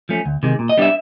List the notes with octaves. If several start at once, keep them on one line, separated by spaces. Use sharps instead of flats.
F3 A3 C#4
D2
C3 D#3 G#3
A#2
D#5
G3 B3 D4 E5